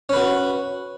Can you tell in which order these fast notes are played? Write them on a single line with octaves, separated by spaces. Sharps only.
C#4 B4 F#4